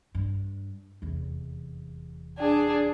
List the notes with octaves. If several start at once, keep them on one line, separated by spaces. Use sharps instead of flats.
G2
F1 E2
D4 G#4